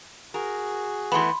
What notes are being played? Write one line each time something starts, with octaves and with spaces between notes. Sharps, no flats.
F#4 G#4 A#4
E3 A3 B3 B5 C6